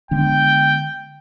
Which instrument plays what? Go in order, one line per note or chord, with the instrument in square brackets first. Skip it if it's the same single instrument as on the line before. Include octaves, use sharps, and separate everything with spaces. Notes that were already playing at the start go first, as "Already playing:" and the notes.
[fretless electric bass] D3 G#3 B3 D4 [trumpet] G5